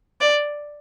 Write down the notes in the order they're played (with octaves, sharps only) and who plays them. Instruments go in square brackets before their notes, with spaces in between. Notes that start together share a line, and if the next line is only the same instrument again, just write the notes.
[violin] D5